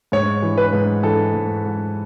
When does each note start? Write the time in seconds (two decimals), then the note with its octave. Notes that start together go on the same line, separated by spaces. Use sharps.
0.12 G#2 C#5
0.42 E3
0.58 B4
0.73 G#2
1.03 E3 A4
1.34 G#2
1.65 G#2